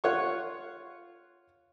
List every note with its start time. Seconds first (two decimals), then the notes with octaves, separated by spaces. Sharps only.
0.04 F4 C#5 F#5 C#6